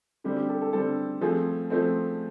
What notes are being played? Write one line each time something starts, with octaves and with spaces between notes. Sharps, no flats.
D3 G3 C4 G4
G4
A4
A4
D3 G3 C4 A4
F3 A3 C4 G#4
F3 A3 C4